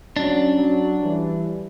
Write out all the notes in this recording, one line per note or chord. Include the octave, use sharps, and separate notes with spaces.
F#3 C#4 D4
F#3
E3 G3